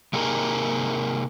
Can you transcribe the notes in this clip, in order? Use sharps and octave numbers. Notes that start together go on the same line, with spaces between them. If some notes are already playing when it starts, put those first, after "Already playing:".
C3 A#3 D#4 G#4 A#4